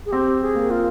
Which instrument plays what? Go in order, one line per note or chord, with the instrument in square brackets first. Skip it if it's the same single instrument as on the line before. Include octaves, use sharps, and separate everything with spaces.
[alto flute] G#4
[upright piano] C4 [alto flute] G4
[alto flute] G#4
[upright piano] A#3
[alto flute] F4